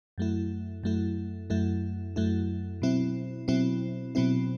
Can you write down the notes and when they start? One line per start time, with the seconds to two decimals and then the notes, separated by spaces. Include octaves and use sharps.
0.18 F#2 F#3 A3 E4
0.84 F#2 F#3 A3 E4
1.50 F#2 F#3 A3 E4
2.16 F#2 F#3 A3 E4
2.82 B2 F#3 C4 E4
3.48 B2 F#3 C4 E4
4.15 B2 F#3 C4 E4